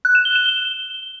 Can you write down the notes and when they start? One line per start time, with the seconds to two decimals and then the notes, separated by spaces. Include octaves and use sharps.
0.05 F#6
0.15 E7
0.25 G7
0.35 E7
0.46 G7